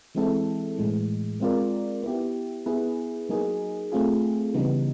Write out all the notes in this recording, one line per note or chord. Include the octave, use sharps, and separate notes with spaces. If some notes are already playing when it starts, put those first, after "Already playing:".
E3 G#3 C4 E4 A4
A2 E3 G#3
G#3 C4 F4 A#4 D5
B3 E4 G4
B3 E4 G#4 B4
F#3 A#3 D#4 G#4
A3 C4 F4 G#4
C#3 E3 G3 B3 D#4